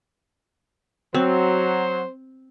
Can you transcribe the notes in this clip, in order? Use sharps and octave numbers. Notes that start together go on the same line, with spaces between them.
F#3 C4 C5